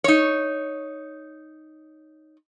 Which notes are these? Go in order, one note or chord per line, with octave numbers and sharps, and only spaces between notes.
D#4 C#5